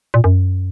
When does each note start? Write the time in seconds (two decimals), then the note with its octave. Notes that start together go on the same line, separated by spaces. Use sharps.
0.14 A#2
0.24 F#2